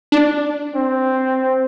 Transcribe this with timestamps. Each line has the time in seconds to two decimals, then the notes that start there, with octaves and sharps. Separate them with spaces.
0.12 D4
0.75 C4